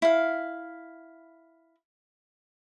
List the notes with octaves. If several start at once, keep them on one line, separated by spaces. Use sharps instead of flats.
E4 F5